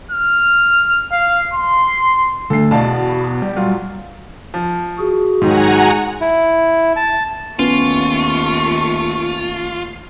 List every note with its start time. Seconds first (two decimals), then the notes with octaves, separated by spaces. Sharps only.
0.11 F6
1.12 F5
1.53 C6
2.50 D2 A4 C7
2.71 E2 B2 D5 F5 A5
3.20 B2
3.42 G3
3.56 A#2 F#3 F4
4.54 F3
4.98 F#4 G#4
5.42 G#2 D#3 F#3 F#5 G#5 A#5
6.21 E4
6.96 A5
7.59 D#2 A3 B3 C#4 F4 C#6